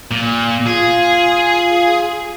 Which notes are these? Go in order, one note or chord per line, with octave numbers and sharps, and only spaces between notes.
A#2
F4 G#4